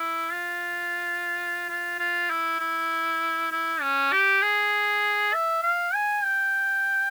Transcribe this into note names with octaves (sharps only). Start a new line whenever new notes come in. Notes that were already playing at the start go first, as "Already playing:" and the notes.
Already playing: E4
F4
F4
F4
E4
E4
E4
C#4
G4
G#4
E5
F5
G#5
G5